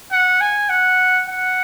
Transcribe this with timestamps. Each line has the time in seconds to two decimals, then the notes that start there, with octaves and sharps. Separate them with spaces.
0.11 F#5
0.40 G#5
0.69 F#5
1.27 F#5